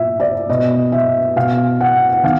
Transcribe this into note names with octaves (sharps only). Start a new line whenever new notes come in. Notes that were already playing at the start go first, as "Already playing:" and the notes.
Already playing: A#2 E5
D5
B2 D#5
E5
B2 F5
F#5
F#5
D#3 F5